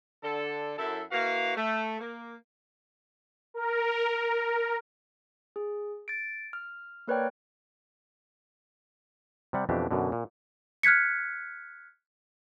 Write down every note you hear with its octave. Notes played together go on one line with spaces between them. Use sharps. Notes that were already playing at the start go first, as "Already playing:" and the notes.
D3 A4
F#2 E4 A4
A#3 E4 F#4 B4 F5
A3
A#3
A#4
G#4
A6 D7
F6
A#3 A#4 B4 C#5 D5 G5
C3 G3 F#5
F2 B2 E3 D4 G4
F#2 B2 D3
A#2
F6 F#6 G#6 B6 C#7